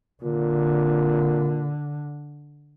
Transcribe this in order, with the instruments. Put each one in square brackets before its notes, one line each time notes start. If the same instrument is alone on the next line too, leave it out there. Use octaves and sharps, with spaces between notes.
[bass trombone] A#2 [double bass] D3